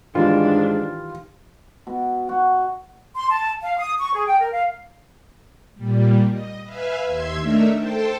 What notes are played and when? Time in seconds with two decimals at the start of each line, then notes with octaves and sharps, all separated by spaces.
0.15 G#2 D#3 E3 G3 D4 F4
1.87 B2
2.29 F#4
3.15 C6
3.29 A5
3.62 F5
3.78 D#6
3.99 C#6
4.14 G#4
4.26 G5
4.39 A#4
4.52 F5
5.75 A#2 G3
6.31 D#5
6.63 B4 E5 F5 G#5
7.05 D#2 E5 C6 G#6
7.41 A3 D4 D#4 A#4 E5
7.77 A4 C5 G5 A5